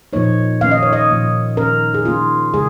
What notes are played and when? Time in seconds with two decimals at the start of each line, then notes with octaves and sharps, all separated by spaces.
0.13 A#2 F3 A#3 D#4 C#5
0.61 D#3 A#3 C#4 F5
0.71 D#5
0.83 C#5
0.93 D#5
1.10 A#2 F3 A#3
1.57 D#3 C#4 A#4
1.94 G#4
2.05 D#3 A#3 C#4 F4
2.54 C#3 G#3 G#4